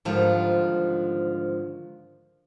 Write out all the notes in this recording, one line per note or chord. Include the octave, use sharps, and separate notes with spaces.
G#2 D3 D#3 F3 G3